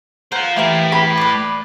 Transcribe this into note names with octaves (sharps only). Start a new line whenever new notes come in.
A#4 C5 F5 F#5
A2 E3 A3 E4 G4 A#4
B5
B4 D5